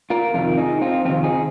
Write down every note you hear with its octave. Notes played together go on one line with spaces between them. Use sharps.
F4 A#4
F2 C3 D#3 F4 A#4
D#4 G#4
C4 F4
F2 C3 D#3 C4 F4
D#4 G#4